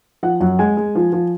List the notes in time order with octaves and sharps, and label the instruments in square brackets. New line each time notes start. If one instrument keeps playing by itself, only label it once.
[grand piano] F3 F#5
F#2 F#5
G#3 G#5
G#3
F3
F3